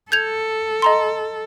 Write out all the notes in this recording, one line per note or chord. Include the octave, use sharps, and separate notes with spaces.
A4 G6 G#6 F7
D#5 A#5 C6